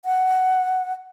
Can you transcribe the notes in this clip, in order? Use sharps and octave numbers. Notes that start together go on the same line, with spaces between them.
F#5